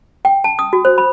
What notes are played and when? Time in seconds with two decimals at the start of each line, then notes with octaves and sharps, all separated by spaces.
0.25 G5
0.44 A5
0.59 D#6
0.73 F#4
0.85 C5
0.98 B5